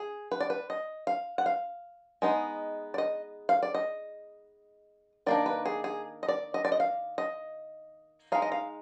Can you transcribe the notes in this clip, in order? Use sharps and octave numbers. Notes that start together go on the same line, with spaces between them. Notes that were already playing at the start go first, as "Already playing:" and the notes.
Already playing: G#4
B4
D5
B4
D#5
F5
F#5
F5
G#3 B3 D#4
D5
D#5
F5
D5
D#5
D#3 A#3 D4 D5
B4
G#4
G#4
D#5
D5
D#5
D5
D#5
F5
D#5
G#3 D#4 F5
D#5
F5